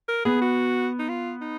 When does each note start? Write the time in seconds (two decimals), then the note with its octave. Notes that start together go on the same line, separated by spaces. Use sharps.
0.08 A#4
0.25 B3 G#4
0.42 F#4
0.99 D#4
1.09 F4
1.42 D#4